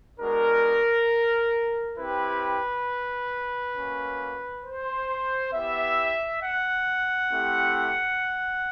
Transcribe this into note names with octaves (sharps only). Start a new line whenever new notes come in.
G#3 B3 D4 F#4 A#4
C4 E4 G4 B4
A#3 C#4 F#4
C5
B3 E4 G4 E5
F#5
A3 C4 E4 G4